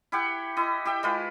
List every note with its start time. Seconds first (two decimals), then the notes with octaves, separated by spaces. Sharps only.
0.12 E4 G4 F#5
0.57 E4 D#5
0.85 G4 E5 G5
1.03 G#3 F4 B4